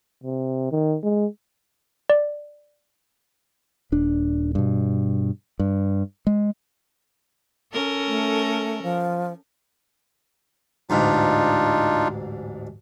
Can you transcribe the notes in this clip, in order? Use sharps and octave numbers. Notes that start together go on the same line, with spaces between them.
C3
D#3
G#3
D5
D#1 D4
G2 B2
G2
G#3
C#4 A4 A#4
A3
F3
A1 D2 G#2 D4 D#4 F4